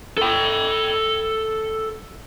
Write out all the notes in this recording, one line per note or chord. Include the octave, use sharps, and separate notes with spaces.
A4 G5